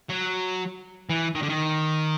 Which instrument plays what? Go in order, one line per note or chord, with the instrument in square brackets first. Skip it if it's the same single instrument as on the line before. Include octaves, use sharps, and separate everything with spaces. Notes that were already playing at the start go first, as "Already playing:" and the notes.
[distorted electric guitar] F#3
E3
D#3
D3
D#3